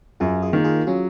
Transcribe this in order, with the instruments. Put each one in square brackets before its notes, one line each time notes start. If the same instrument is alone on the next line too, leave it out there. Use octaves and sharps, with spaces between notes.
[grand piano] F#2 [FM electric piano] F4 G#4
[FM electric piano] F4 G#4
[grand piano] D#3 A#3
[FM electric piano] F4 G#4
[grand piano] F#3 [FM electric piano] C#4 F4